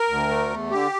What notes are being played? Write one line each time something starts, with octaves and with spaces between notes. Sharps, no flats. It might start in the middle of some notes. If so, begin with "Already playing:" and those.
Already playing: A#4
D2
A3
E2
D3 G4